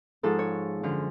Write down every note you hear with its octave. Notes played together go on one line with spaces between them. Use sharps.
G#2 F3 A4
C#5
F#2 D3 F3